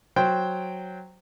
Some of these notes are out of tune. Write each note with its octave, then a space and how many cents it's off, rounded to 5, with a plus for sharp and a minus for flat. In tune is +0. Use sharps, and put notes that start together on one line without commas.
F#3 +0 C5 +0 G5 +0